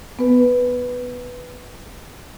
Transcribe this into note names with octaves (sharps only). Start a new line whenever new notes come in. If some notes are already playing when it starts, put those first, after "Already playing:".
B3 B4